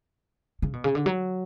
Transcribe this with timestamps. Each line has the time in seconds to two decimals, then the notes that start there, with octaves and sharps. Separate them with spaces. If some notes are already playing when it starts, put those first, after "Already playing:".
0.62 C#3
0.73 B2
0.84 C#3
0.95 D3
1.06 F#3